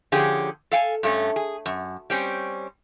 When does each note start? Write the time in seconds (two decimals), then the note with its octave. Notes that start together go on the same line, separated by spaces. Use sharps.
0.12 D3 F3 C#4 G4 G#4
0.71 A4 F5 G5 G#5
1.03 G2 A3 C#4
1.36 G#4
1.66 F#2
2.10 G3 C4 C#4